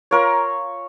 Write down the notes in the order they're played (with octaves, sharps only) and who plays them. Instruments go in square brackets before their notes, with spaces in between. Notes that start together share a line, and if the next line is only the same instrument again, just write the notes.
[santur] F4 A#4 C#5